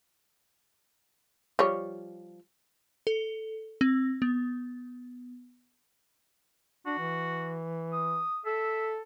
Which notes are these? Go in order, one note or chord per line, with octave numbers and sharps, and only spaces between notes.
F3 G3 C#5
A4
C4
B3
D4 F#4
E3
D#6
A4 E5